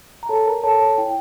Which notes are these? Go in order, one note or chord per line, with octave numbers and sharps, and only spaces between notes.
A#5
A4 C#5 A5
A#4 A#5
A4 C#5 A5
C#5
E4 G5